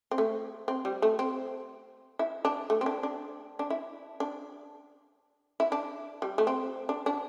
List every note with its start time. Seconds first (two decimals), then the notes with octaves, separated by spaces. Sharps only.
0.11 C4
0.18 A3
0.68 C4
0.85 G3
1.02 A3
1.19 C4
2.19 E4
2.45 D4
2.70 A3
2.81 C4
2.86 D4
3.03 D4
3.59 D4
3.70 E4
4.20 D4
5.60 E4
5.72 D4
6.22 G3
6.38 A3
6.47 C4
6.89 D4
7.06 D4